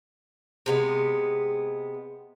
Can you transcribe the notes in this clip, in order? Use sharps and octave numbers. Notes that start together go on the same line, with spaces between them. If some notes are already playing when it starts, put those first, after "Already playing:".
C3 G#3 B3